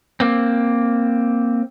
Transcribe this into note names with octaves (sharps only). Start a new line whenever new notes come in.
A#3 C4